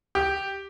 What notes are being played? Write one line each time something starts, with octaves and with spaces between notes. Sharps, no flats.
G4